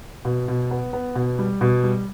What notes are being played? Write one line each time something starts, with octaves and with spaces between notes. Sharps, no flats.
B2
B2
B3
B3
B2
G3
B2
G3